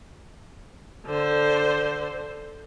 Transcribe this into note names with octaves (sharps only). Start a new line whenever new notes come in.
D3 C5